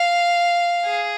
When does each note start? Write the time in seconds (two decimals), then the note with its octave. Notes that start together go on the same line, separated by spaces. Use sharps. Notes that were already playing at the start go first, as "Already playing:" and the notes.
Already playing: F5
0.86 G#4